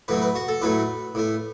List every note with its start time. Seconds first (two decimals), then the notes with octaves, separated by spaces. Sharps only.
0.08 A2 F#3 A3 B4
0.22 B4
0.35 F#4
0.48 A4
0.62 A2 F#3 A3 B4
1.15 A2 A3